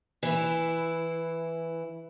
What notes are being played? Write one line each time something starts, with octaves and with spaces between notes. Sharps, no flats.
E3 E4